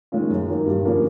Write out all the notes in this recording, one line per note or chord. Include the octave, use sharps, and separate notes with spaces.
D#3 G#3 C#4 F4
F#2
D#3 F#3 A#3
G2
D3 F3 A#3 C#4